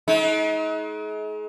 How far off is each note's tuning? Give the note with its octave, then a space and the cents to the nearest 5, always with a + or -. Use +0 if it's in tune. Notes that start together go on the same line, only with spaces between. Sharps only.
G#3 +40 D#4 +35